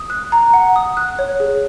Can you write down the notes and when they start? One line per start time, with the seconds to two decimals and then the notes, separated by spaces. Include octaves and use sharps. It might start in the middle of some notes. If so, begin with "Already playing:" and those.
Already playing: D#6
0.10 F#6
0.32 A#5
0.54 F#5
0.76 D#6
0.97 F#6
1.19 C#5
1.40 G#4